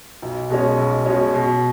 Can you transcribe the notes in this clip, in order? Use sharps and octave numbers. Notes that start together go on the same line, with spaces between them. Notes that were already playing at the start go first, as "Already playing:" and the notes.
B1
B2 G#3 C#4
B1
B2 G#3 C#4
B2